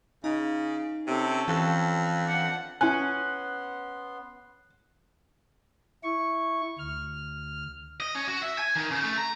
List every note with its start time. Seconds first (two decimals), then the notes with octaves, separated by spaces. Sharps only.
0.24 C#3 D#4
1.07 C3 C#4 A4
1.48 F2 E3
2.24 D4 F#5
2.81 B3 C#4 E4 G#5 C6 F#6
6.03 E4 C#6
6.79 D2 F6
8.00 D#5
8.15 C#4
8.27 F#4
8.42 E5
8.58 G#5
8.76 D#3
8.91 C#3
9.03 A3
9.17 A#5